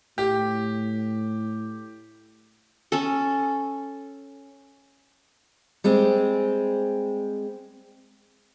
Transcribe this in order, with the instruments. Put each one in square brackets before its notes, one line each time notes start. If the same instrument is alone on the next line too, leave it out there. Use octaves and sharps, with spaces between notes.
[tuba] A2 [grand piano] G4
[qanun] C#4 A4
[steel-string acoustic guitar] G3 G#3 C4